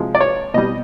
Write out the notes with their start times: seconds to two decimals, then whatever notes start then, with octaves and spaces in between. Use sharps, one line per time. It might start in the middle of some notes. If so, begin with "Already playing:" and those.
Already playing: C3 F3 G#3
0.15 D5
0.21 C#5
0.54 B2 G3 D#5